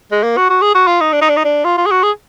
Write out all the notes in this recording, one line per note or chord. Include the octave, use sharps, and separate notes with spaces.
G#3
A#3
F#4
F#4
G#4
F#4
F4
D#4
D4
D#4
D4
D#4
D4
F4
F4
G#4
F#4
G#4